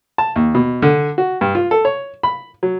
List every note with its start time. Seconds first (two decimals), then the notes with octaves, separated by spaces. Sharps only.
0.18 A5
0.36 D#2
0.55 B2
0.82 D3
1.18 F#4
1.41 G2
1.55 F4
1.71 A4
1.85 C#5
2.23 B5
2.63 F#3